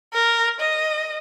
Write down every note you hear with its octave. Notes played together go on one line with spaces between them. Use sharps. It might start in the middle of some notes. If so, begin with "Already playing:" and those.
A#4
D#5